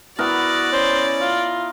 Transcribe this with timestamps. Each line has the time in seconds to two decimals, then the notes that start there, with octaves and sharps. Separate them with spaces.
0.19 B3 E4 F#4 A#4 D5
0.72 C#4 C5
1.21 F4